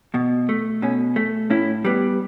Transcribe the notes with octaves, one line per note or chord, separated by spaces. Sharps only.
B2
A3
B2 C#4
A3
A2 C#4 E4
G3 B3